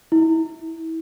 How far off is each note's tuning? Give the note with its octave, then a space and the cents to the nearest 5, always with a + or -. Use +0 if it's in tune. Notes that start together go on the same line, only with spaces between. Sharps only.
E4 -25